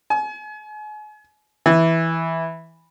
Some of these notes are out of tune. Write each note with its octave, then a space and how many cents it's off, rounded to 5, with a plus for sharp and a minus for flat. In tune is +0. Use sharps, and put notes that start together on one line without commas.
G#5 +35
E3 -5